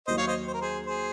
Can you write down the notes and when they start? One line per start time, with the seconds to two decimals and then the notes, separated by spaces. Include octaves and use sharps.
0.07 D#2 D#3 F#3 C5 D#5
0.18 C#5 F5
0.27 C5 D#5
0.48 C5
0.54 A#4
0.61 G#4 C5
0.86 G#4 C5